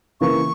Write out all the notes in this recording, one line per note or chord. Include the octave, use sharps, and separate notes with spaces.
C#3 E3 A#3 C#6